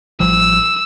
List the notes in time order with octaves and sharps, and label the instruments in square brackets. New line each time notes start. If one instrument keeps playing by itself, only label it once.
[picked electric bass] A1 F3 G3 [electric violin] E6